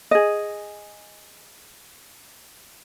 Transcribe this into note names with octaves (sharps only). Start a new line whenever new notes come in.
G#4 D#5